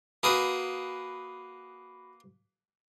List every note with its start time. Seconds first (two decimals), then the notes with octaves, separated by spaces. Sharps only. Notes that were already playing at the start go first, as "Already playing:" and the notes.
0.23 A#3 F#4 G#4 B4 B5